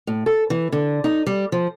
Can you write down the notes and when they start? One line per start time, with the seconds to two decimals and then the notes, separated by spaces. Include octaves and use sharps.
0.07 A2
0.26 A4
0.50 E3
0.72 D3
1.04 D#4
1.26 G3
1.52 F3